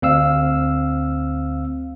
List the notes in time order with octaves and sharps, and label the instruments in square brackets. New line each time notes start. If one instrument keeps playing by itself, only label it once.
[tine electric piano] D2 C4 F5 E6